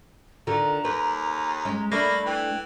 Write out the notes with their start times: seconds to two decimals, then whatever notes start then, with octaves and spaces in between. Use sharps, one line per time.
0.47 D3 D#3 F4 A#5
0.85 D#2 B4
1.65 G#3 C#4
1.92 A3 A#3 D4 B5
2.26 E3 G5